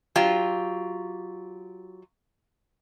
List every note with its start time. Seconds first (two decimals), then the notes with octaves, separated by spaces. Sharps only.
0.16 F#3 F4 G4